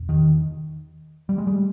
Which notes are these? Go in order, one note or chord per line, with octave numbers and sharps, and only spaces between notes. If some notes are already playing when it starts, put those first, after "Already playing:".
Already playing: E1 E2
D#3
G3
G#3
G3